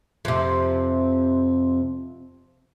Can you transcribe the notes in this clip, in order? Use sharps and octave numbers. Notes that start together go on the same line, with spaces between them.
F2 C3